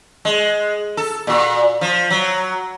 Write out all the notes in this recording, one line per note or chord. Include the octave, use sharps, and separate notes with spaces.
G#3
A4
A#2 F#4
F3
F#3